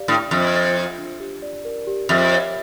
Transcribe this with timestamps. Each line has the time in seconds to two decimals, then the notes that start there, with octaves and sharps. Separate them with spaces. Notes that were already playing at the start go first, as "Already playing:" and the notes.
Already playing: G4 D5 F5
0.08 A2 D4
0.31 F2 E5
0.54 A4
0.75 F4
0.98 D4
1.20 G4
1.42 D5
1.65 A#4
1.87 G4
2.09 F2 E5
2.32 C#5